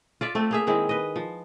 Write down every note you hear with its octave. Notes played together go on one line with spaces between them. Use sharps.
F4 D5 E5
A3 C4
A#3 G#4 E5
D#3 G#3 C4 E4
B4 D#5
F3